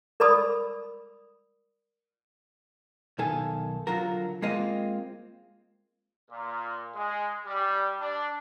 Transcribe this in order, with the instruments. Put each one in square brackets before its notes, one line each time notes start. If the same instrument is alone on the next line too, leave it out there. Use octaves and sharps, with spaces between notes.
[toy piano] A#4 D5 B5 D#6 E6
[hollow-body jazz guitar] B1 D#3 A4 G#5
D3 F#3 F4 F#4 A#4
G#3 A#3 C4 F4 D#5
[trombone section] A#2
G#3
G3
D4